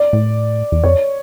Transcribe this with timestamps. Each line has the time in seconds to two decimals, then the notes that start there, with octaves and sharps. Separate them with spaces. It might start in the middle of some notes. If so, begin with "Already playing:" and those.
Already playing: D5
0.13 A2
0.72 E2
0.84 F2 C#5